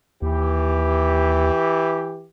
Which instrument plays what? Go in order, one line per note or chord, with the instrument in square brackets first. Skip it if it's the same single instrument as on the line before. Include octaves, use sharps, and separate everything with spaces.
[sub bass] D#2 [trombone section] E3 G4